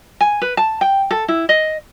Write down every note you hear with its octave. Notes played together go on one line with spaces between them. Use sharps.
G#5
B4
A5
G5
A4
E4
D#5